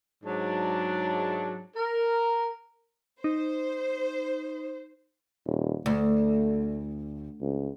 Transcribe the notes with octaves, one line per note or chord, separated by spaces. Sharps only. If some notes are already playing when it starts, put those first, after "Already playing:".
G#2 F#3 D4
A#4
D#4 C5
D#1
D2 A3
C#2